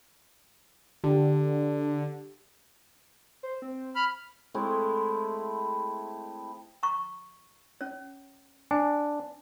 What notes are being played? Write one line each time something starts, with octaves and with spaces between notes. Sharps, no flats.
D3 G4
C5
C4
B5 F6
G#3 A3 C4 E4
A#5 C#6
C#4 C#5
D4 G#5